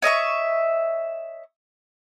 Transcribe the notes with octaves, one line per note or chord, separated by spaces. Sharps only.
C#5 D#5 E5 C#6